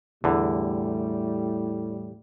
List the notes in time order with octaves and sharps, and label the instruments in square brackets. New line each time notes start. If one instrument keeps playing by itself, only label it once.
[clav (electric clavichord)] E2 D3 [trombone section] A2 G3